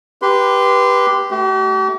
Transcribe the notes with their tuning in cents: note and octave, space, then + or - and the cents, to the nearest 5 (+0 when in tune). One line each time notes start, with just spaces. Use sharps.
G4 +0 B4 -15 C6 -25
A3 -10 G4 -45